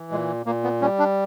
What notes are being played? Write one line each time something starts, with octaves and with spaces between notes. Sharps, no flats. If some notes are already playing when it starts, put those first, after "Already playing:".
Already playing: E3
A#2 G#3
A#2 A#3
B3
G3 C#4
D4